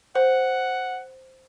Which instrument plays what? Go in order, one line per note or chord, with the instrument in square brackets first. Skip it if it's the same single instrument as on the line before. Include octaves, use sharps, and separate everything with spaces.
[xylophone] C5 [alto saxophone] F#5